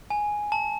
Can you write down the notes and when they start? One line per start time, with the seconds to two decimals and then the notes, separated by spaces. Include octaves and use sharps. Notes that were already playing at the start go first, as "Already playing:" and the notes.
0.10 G#5
0.52 A5